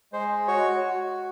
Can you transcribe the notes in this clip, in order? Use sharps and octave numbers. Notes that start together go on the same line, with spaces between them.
G#3 C5
F#4 C#5
F#4